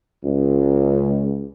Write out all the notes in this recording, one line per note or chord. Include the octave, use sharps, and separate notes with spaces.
C#2